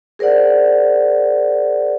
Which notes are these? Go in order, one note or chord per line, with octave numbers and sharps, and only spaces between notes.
G#4 A#4 C5 D5 F#5